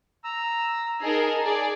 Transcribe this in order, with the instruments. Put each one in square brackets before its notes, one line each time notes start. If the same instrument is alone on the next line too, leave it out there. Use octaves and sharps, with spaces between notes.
[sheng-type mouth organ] A#5 E6
[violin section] D#4 G#4 A#4 [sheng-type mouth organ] G#5 A5
[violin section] G#4 D5